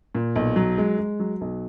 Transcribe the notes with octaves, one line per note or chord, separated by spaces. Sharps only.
A#2
B1
F#3
G#3
G#3
F#3
B1